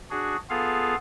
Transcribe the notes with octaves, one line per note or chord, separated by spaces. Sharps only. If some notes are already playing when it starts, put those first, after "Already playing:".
D4 F#4 G#4
B3 F4 G#4 A4 F5